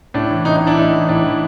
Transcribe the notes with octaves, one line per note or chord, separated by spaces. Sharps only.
A2 D4
E3
A2 D#4
E3 D#4
D4 E4
A2 D#4
E3
A2 D4
E3